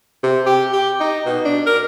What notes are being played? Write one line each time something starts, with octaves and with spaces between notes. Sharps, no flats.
C3
G4
G4
D#4
B2
D4
A#4